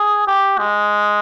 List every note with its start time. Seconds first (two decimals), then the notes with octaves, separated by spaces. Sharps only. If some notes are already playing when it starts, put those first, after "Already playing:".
Already playing: G#4
0.27 G4
0.58 G#3